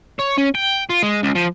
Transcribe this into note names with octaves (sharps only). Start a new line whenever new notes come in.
C#5
C#4
G5
F4
G#3
C#2
F3